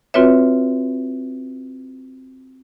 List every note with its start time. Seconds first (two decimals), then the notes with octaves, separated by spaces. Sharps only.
0.14 C4 F4 F#4 B4 C#5 E5